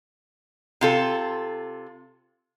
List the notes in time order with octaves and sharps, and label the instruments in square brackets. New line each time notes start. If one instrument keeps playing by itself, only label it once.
[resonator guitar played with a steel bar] C3 F4 A4